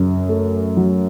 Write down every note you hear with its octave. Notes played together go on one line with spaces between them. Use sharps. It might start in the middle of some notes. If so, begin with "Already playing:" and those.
Already playing: F#2 C#3
A3
F#3